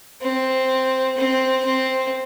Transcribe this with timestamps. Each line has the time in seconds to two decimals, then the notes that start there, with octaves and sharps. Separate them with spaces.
0.22 C4
1.17 C4
1.65 C4